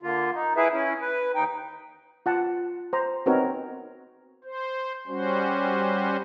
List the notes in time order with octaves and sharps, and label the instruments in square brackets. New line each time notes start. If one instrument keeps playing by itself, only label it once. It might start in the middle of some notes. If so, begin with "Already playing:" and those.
[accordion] D3 A#3 F4
D#4
E4 G#4 B4 E5
C#4 E4
B4
D#2 D#4 G5
[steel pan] F4 F#5 A5
C5 A#5
B3 C4 D#4 F#4 A#4 C#5
[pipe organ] C5
G3 C#4 F#4 C5